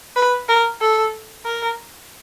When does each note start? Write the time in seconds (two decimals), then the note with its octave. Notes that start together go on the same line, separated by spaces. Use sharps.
0.16 B4
0.49 A#4
0.81 A4
1.45 A#4